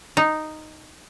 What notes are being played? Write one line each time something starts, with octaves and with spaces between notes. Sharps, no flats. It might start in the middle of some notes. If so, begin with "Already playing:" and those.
D#4